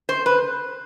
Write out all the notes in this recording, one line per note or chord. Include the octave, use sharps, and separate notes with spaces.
C5
B4